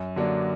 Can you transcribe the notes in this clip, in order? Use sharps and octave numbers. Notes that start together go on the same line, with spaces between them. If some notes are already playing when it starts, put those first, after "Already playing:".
Already playing: F#2
D3 F#3 A#3 D4